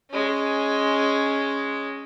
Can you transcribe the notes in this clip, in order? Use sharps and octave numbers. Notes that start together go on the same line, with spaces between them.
G#3 C#4